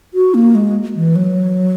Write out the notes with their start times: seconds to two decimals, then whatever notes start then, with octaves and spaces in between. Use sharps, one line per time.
0.14 F#4
0.34 A#3
0.55 G#3
0.96 E3
1.16 F#3